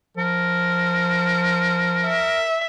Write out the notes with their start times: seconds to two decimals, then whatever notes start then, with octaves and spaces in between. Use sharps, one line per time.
0.17 F3 A#4
2.06 E5